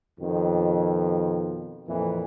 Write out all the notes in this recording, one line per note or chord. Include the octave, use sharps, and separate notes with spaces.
F2 B2 D#3
F2 A#2 E3